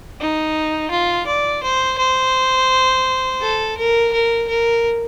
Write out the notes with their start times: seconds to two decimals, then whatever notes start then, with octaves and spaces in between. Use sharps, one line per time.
0.21 D#4
0.91 F4
1.27 D5
1.63 C5
1.98 C5
3.41 A4
3.77 A#4
4.13 A#4
4.49 A#4